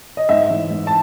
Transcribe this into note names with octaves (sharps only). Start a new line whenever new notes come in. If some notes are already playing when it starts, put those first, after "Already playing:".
D#5
G#2 E5
A1
G#2
A5